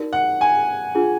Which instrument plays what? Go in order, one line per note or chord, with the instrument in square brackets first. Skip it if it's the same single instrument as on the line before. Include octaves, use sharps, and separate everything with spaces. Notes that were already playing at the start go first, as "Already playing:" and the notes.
Already playing: [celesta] D#4 F#4 A#4 D5
[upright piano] F#5
G#5
[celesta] D4 F4 G#4